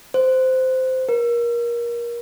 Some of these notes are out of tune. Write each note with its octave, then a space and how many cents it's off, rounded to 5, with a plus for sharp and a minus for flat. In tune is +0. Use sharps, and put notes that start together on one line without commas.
C5 -15
A#4 +25